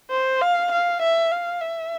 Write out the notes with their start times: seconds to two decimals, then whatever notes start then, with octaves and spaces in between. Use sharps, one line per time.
0.10 C5
0.41 F5
0.72 F5
1.02 E5
1.32 F5
1.61 E5